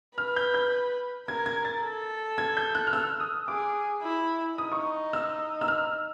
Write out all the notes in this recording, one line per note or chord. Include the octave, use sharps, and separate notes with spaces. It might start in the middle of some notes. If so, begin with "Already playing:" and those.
B4 F6
G6
G6
A#4 G#6
G#6
A6
A4
G#6
G6
F#6
F6
E6
D#6
G#4 D6
E4
D#4 D#6
C#6
E6
E6
F6